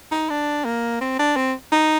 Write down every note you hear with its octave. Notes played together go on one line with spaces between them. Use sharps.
D#4
D4
A#3
C4
D4
C4
D#4